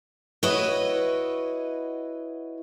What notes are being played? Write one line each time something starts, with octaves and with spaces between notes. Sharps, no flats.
E4 F#4 B4 C#5 D#5